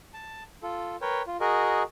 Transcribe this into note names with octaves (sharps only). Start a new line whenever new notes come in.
A5
F4 A4
A#4 B4 C#5 G5
F4
F#4 G#4 A#4 D#5